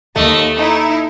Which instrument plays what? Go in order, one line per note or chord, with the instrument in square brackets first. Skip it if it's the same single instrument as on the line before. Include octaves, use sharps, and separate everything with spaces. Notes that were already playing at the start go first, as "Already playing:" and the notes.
[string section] D#2 D#5 [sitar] A3
[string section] D#4 E4